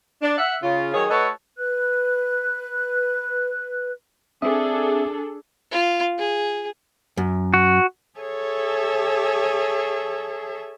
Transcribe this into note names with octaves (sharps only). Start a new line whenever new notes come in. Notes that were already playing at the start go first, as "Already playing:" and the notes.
D4
E5 F#5
C#3 F4
D#3 F#3 G#4 C#5
A3 F#4 A4 B4 C#5 D#5
B4 F#6
C4 D4 G#4 A4 E5 D#6
F4
G#4
F#2
F#4
G#4 A4 C#5 E5